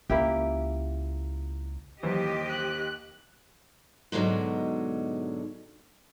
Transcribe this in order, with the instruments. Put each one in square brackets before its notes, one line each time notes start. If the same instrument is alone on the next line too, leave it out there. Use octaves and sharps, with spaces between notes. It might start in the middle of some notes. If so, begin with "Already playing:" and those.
[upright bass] C#2 [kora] A#3 E4 G4
[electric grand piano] D#2 C5 [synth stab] E3 F#3 [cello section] G4 D#5
[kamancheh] F#6
[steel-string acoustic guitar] G#2 B2 D3 F#3 G#3